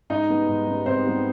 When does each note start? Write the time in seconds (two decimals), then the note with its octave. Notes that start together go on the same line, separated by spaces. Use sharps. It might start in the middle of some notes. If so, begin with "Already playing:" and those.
0.10 G#2 D#4 D#5
0.29 G3 B3
0.49 G#2
0.67 G3 B3
0.86 G#2 C4 C5
1.05 G3 B3